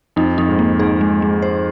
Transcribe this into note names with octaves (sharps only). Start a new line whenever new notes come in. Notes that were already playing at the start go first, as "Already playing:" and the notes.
F2 D#4
F2 D#4
G#2
A#3
G#2 G#4
G#3
G#3
C5